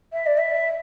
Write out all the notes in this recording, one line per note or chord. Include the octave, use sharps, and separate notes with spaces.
E5
D5
E5